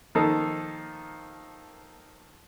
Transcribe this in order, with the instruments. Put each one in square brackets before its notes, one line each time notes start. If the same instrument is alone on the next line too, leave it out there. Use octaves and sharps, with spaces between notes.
[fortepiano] D#3 F3 A#3 D#4 A4